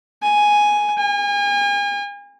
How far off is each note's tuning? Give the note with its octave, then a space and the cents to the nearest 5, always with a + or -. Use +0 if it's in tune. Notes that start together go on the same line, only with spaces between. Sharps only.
G#5 +0
G#5 -40